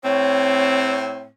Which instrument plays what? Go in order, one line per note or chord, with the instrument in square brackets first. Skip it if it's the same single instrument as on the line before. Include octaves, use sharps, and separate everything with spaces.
[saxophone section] A2 C4 [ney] C#5